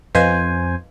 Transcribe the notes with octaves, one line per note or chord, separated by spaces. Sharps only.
F2 B4 C5 D#5 F5 G#5